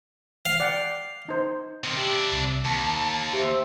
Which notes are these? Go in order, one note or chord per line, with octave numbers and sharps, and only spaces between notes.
F5
D5 F#5 G5
D#4 C5
C3 D#3
D4 E4 G4
C2
D#2 A5
G4 C5 E5